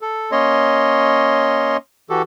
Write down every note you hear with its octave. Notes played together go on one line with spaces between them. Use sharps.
A4
A#3 C#4 C#5 D#5 C6
E3 F#4 G4 A4